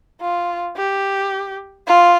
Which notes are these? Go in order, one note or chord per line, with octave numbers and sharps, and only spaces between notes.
F4
G4
F4